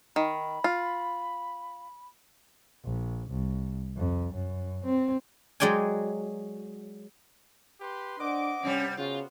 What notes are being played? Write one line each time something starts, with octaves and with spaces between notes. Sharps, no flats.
D#3 B5
F4
A#1
C2
F2
F#2
C4
F#3 G#3 D5 G5 G#5
G4 B4 C6
D4 C5 D5 D#5 F#5 D6
G2 C3 G3 C#4
C#3 B3 F4 F#4